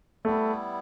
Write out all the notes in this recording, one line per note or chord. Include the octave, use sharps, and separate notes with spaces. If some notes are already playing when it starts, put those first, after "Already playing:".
G3 A3 B3 E4